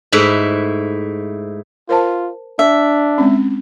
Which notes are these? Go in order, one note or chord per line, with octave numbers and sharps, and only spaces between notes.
G#2 A3 E4 B4
F4 A#4 C5 A5
D4 E5
G#3 C4 C#4